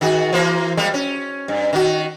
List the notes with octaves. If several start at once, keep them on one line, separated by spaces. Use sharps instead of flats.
D#3 F#4 G#4
E3 A#3 C5
G3 G#3 A#3
C#4
G2
D#3 F#4